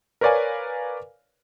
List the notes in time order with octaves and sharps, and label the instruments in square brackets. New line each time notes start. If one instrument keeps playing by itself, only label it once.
[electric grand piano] A#4 B4 C#5 D5 F5 G#5